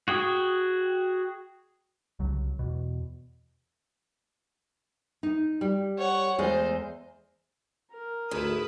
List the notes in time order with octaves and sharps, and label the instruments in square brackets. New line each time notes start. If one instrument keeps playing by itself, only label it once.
[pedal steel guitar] F#4 G#4 G5 D#6
[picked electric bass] C2 C#3 F#3
E2 B2
[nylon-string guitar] D#4
G3
[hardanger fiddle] C#5 F#5
[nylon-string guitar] E2 G#3 A3 [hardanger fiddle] C5
[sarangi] A#4
[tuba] D2 [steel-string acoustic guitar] G#2 [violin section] E4 B4 D#6